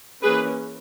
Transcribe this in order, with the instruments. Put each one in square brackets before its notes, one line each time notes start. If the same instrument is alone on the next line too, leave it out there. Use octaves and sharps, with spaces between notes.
[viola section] E3 A#3 C#4 G#4 B4